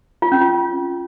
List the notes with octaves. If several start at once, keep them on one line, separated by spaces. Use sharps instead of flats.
F4
C#4
F4